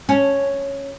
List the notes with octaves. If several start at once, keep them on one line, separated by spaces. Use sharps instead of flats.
C#4